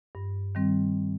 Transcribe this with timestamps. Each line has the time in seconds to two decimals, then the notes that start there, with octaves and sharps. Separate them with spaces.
0.15 G2
0.55 D#3 G3 C4